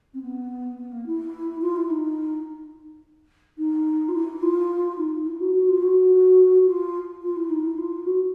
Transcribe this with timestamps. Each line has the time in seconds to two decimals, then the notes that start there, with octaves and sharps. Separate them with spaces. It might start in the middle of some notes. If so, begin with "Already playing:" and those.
0.14 C4
0.21 B3
0.78 B3
0.92 A#3
1.06 E4
1.61 F4
1.76 E4
1.90 D#4
3.58 D#4
4.08 F4
4.14 E4
4.42 F4
4.97 D#4
5.26 E4
5.40 F#4
5.54 F#4
5.68 F4
5.82 F#4
6.66 F4
7.22 F4
7.36 E4
7.49 D#4
7.64 E4
7.78 F4
8.06 F#4